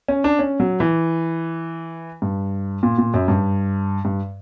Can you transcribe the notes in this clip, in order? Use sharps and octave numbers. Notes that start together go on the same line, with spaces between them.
C#4
D4
C#4
F#3
E3
G2
A#2
A#2
F#2
G2
G2